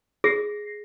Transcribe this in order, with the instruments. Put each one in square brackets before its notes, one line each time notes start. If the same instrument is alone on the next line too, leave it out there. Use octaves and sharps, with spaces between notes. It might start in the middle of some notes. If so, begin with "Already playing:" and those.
[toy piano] G#4 [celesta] A#6 C7